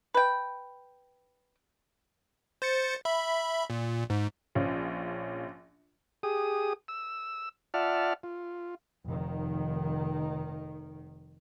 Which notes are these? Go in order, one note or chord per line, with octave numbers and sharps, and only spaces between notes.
B4 G5
C5 A6 C#7
E5 B5
A#2
G#2
A#1 F3 C#4
G4 G#4 D#6
E6
F4 D5 E5 F#5 A5 F6
F4
F1 D#3